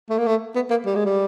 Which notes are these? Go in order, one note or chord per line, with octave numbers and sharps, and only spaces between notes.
A3
A#3
A3
B3
A#3
G3
G#3
G3